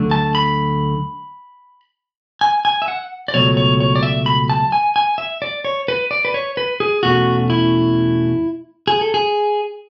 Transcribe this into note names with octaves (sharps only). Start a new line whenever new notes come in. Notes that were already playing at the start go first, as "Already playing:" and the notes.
Already playing: D2 D3 F#3 A3 D4
A5
B5
G#5
G#5
E5
F#5
D5
C#2 B2 F#3 A3 C#5
C#5
C#5
D5
E5
B5
A5
G#5
G#5
E5
D5
C#5
B4
D5
B4
C#5
B4
G#4
E2 B2 A3 C#4 F#4
E4
G#4
A4
G#4